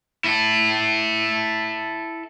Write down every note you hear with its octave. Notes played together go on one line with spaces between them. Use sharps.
E4 A4